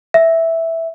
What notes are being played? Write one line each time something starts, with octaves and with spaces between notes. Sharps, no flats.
E5